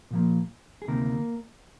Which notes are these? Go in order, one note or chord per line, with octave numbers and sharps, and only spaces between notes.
A#2 F3 A#3
G#4
D2 C3 D#3 A#3 A#4